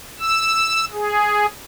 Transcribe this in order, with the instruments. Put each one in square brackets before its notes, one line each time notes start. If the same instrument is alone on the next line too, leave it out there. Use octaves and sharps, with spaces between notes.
[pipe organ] E6
G#4